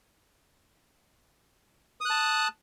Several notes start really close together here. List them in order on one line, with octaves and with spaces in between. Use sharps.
D#6 F#6 A5